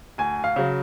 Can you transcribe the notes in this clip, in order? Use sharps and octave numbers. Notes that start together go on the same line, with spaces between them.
D2 G#5
F5
C#3 F#3